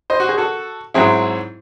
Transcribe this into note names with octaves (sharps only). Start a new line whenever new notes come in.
C5 D#5
F#4
G#4
F#4 A4
G#2 F#3 C4 E4 G#4